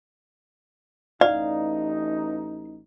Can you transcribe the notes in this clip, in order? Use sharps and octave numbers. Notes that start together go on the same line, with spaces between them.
A1 D#4 D5 F5